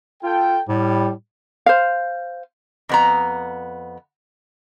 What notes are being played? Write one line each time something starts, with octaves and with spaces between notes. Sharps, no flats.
F4 A4 G5
A2 G3
C5 F5
F2 B3 A#5